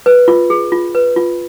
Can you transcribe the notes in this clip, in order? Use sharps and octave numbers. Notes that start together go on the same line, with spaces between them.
B4
F4
G#4
F4
B4
F4